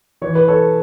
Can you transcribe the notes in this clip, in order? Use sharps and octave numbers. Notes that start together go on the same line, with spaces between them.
E3 C#5
B4
A4 C#5